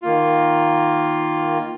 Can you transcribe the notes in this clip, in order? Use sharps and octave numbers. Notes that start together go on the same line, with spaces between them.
D#3 A#3 F4